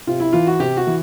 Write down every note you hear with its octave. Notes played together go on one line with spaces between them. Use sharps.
C3 F4
E4
E3 F4
F#4
C3 G4
F#4
E3